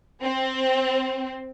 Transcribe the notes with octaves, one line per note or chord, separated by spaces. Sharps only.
C4